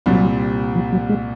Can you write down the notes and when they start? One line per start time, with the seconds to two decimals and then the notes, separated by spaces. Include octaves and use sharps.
0.06 C2 A#2 F#3 G3 C4
0.75 F3
0.93 F#3
1.09 G#3